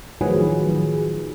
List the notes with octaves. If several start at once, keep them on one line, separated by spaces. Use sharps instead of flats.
A2 D#3 F3 F#3 G#4 B4